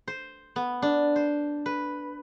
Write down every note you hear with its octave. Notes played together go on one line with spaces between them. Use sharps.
C5
B3
D4
C5
B4